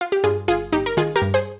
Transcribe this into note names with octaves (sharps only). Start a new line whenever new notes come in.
F4
G4
G2 F4 G#4
G1 F4 G#4
G1 D#4 G4
A#4
D#3 F4 G#4
G4 A#4
G2
G#4 C5